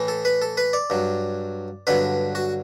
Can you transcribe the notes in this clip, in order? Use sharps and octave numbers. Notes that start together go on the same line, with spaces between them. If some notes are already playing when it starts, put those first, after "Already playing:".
Already playing: A2 E3
A4
B4
A4
B4
D5
G2 F#3
G2 D3 F#3 B4
F#4